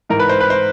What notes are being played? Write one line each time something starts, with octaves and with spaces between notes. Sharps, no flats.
G#2 E3 A#4
B4
C5
B4
C5